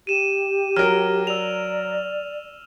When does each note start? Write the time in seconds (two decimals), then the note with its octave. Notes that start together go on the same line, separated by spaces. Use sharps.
0.07 G4 D#7 E7
0.76 F#3 A#4 F6
1.27 D5 E6 F7